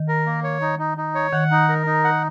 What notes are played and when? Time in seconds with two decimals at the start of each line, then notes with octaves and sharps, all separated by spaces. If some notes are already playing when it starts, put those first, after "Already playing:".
Already playing: D#3
0.08 A#4
0.26 A#3
0.43 C#5
0.61 D#4
0.79 D#4
0.98 D#4
1.15 C#5
1.33 D#3 F#5
1.51 D#4
1.69 A#4
1.86 D#4
2.04 F#5